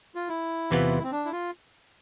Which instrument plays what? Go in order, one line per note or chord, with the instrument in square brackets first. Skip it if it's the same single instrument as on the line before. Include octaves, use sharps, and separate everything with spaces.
[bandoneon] F4
E4
[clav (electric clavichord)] E2 C3 E3 B3 F4
[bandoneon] C4
D4
E4
F4